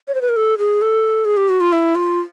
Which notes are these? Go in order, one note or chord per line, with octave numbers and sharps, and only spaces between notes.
C#5
C5
B4
A#4
A4
G#4
A4
G#4
G4
F#4
F4
E4
F4